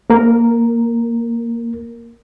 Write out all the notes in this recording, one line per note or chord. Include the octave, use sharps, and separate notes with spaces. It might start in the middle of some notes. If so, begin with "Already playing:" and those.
A#3 A#4